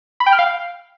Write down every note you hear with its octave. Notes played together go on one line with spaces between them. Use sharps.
B5
G5
F6
F5